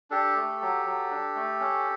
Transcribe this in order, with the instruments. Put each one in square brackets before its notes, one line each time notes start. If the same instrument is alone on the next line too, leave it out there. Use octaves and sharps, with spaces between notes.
[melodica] D4 G4 A4
A3
F#3
F#3
D4
A3
C#4